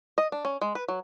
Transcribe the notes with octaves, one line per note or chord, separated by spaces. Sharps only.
D#5
D4
C#4
G#3
B4
F#3